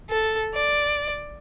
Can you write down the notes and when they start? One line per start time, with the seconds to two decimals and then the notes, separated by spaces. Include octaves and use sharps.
0.10 A4
0.54 D5